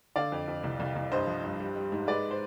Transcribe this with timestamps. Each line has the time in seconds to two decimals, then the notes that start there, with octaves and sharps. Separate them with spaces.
0.16 D3 D5 F5
0.32 F2
0.48 F2
0.64 C2
0.80 C2
0.96 C2
1.12 G2 C5 D#5
1.27 F3
1.44 G2
1.59 G3
1.76 G3
1.92 G#2
2.07 G#3 B4 D5
2.31 C5